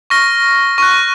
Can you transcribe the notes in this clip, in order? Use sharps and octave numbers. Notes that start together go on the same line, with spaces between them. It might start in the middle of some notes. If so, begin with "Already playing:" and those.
C#6 F6 A#6
C#6 F#6